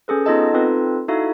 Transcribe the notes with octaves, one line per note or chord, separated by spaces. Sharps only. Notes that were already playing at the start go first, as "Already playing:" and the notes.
C#4 G#4 A4 B4
B3 D#4 F4 A4 D#5 A5
C4 D#4 F4 A4 B4
D#4 E4 F#4 A4 E5 F5